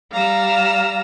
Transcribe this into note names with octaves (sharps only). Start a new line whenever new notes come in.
G3 F5 A#5 E6